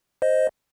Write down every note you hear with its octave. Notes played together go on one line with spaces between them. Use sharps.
C5 D#5